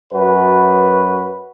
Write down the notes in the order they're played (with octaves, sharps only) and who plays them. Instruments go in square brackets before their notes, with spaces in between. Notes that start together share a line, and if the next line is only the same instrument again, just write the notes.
[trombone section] F#2 F#4 B4